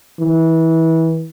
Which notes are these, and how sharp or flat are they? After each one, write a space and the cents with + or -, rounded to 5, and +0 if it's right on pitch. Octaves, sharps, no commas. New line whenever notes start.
E3 -25